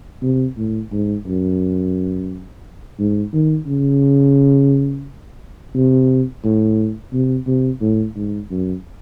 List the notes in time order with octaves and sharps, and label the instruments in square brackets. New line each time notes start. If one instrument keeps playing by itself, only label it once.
[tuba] C3
A2
G#2
F#2
G#2
D#3
C#3
C3
A2
C3
C3
A2
G#2
F#2